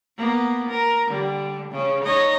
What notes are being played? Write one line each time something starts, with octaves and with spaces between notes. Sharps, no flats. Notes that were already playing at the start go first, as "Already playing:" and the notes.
A#3 B3
A#4
D3 G3
C#3 C#4
D#4 C#5 D#5